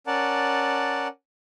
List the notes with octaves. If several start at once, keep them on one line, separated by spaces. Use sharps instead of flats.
C#4 A#4 D5 F#5 A5